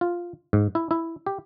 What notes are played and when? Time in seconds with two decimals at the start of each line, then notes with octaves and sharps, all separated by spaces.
0.01 F4
0.53 G#2
0.75 E4
0.91 E4
1.26 G4